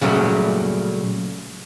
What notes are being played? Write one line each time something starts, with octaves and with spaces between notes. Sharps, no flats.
A#2 C#3 F#3 G3 A3